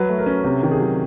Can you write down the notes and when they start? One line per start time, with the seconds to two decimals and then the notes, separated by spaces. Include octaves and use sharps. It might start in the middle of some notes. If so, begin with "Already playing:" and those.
Already playing: F#3 B4
0.09 A3
0.18 A#4
0.26 C#4
0.44 C3
0.63 D#3
0.71 G#4
0.80 F#3